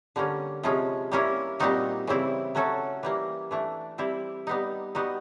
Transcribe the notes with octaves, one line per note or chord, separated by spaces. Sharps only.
D3 G3 A#3 C#4
C3 F3 G#3 C#4
G3 A#3 C#4 E4
A#2 G3 C4 D#4 F#4
C#3 E3 G3 C4 E4
F#3 A3 C#4 F#4 A4
E3 G3 A#3
E3 A3 D4
G3 C4 E4
G3 B3 D#4
G3 B3 D#4 F#4